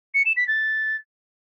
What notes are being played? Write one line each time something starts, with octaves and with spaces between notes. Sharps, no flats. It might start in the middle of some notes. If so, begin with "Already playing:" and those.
C#7
E7
B6
A6